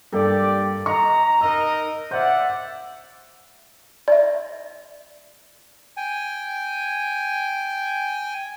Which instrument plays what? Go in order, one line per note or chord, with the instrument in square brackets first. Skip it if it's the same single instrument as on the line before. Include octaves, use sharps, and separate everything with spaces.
[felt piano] G2 A#3 A4 [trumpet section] G4 D5 G5
[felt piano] D#5 C#6 [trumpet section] A#5
[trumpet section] D#4 A#4 D#5 [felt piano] E6
[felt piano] C5 G6 [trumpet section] D5 E5 F#5
[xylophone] D5 E5
[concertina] G5 G#5